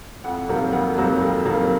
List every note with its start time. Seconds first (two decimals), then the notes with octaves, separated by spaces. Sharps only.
0.24 F2 F#5
0.48 C3 D#3 F#3 A#3
0.73 F2 F#5
0.97 C3 D#3 F#3 A#3
1.21 F2
1.45 C3 D#3 F#3 A#3